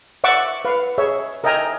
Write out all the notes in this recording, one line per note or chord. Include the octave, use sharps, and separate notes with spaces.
D5 E5 F#5 C#6 D6 E6
B4 F5
G#4 C#5 E5
A#4 D#5 E5 G5 G#5 A#5